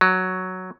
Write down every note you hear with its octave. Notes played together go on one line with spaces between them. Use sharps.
F#3